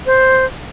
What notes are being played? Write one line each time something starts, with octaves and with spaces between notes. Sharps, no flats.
C5